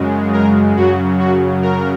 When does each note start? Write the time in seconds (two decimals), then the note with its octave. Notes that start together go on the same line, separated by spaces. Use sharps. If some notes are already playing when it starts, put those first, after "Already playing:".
Already playing: F#2 C#3 G#3
0.33 A#4
0.76 F#2 C#3 F#3 F#4
1.19 F#4
1.62 A#4